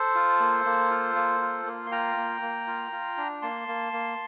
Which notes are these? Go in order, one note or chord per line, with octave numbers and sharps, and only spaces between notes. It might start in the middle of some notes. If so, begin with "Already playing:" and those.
Already playing: A4 C5
F4
A#3
A#3
F4
A#3
F4
A#3
C6
F4 G5 A#5
A#3
A#3
F4
F4
D4
A#3 A5 C6
A#3
A#3